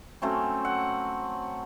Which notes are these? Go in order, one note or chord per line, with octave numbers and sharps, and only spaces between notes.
F#3 A3 C4 C#4
F#5